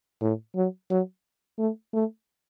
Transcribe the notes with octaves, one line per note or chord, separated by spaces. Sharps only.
A2
F#3
F#3
A3
A3